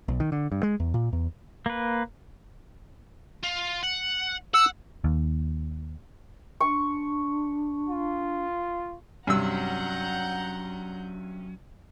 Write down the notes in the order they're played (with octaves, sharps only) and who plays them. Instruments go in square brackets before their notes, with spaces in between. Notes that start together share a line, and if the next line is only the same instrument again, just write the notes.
[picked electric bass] B1
D#3
D3
G2
G#3
E2
A#2
E2
[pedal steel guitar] A#3 B4
[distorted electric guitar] F4
F#5
[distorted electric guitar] F#5 [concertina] E6
[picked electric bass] D#2
[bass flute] D4 [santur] C#6
[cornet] F4
[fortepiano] G2 C3 E6 [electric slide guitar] F#3 C#4 [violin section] F#5 A#5 G6